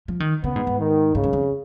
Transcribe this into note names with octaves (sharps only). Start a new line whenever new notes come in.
F3
D#3
C#3 B3
G#2
G#2
D#3
G#2 C#3
F#2
F2